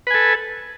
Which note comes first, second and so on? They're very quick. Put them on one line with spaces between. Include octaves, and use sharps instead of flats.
B4 G#5 A4